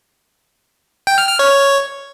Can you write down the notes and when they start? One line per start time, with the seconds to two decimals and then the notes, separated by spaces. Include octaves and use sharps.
1.07 G5
1.18 F6
1.29 F6
1.39 C#5